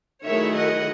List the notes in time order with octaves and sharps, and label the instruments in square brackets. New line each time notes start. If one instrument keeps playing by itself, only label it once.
[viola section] D#3 F#3 A3 E4 G#4 [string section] C#5 E5
[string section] D#5 F#5